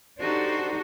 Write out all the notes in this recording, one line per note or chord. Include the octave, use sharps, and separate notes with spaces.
D4 D#4 F#4 G4 A4 C5